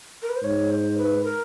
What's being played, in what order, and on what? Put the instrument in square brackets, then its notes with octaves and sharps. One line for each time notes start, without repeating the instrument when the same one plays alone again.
[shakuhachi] A#4
B4
C5
[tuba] G#2 [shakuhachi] C#5
[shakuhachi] C5
B4
A#4